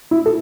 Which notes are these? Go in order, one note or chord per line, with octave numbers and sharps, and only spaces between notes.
E4
A4